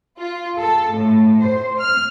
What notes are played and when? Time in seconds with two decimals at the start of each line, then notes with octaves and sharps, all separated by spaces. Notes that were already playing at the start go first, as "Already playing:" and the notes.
0.20 F4
0.59 A4
0.94 A2
1.42 C5
1.80 F6